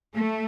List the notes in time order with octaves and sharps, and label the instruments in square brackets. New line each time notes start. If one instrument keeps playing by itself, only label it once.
[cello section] A3